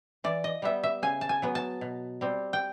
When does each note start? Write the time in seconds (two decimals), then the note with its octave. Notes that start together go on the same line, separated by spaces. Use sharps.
0.24 E3 D5
0.44 D#5
0.62 G3 B3 E5
0.83 E5
1.02 C#3 G#5
1.21 A5
1.29 G#5
1.42 F#3 B3
1.55 A5
1.81 B2
2.21 G3 C4
2.53 G5